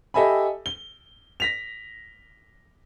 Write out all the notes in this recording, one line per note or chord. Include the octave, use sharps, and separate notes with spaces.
G4 A4 D#5 E5 G#5 B5
G7
A#6 B6 F7